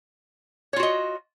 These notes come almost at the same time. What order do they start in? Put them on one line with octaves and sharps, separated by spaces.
C#5 F4 F#4 D#5